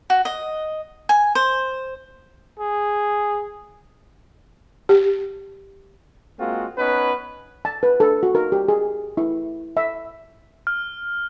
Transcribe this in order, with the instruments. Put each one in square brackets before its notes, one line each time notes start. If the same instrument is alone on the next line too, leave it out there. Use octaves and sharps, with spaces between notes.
[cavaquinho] F#4
D#5
G#5
C5
[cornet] G#4
[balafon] G4
[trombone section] G#3 A#3 C4 F4 F#4
B3 C#4 D#4 B4
[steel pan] A5
B4
A4
F#4
A#4
G4
G#4
E4
E5
[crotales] F6